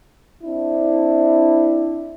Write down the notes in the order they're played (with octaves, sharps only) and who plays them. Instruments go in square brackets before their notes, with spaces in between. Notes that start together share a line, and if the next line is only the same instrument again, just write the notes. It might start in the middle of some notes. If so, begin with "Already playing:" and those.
[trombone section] C4 D4 E4